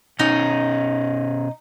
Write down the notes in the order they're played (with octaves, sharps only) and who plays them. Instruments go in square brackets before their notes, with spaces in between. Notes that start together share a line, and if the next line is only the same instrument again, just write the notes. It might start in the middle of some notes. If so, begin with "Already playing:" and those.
[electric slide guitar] B2 C#4 [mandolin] D#4